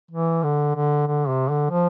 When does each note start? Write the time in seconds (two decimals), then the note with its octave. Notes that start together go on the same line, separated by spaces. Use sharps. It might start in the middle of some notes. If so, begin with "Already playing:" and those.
0.11 E3
0.43 D3
0.75 D3
1.07 D3
1.29 C3
1.50 D3
1.70 F3